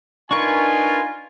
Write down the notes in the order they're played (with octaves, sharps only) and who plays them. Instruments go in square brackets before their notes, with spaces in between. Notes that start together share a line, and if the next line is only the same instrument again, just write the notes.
[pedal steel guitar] D4 A#4 B4 [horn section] D#4 G#5 [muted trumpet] F4 [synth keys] C#6